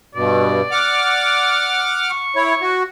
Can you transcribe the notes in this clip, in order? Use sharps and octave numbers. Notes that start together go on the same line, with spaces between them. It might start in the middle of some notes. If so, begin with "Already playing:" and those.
G2 B2 D5
F#5 D6 F6
C#6
E4 C#5
F#4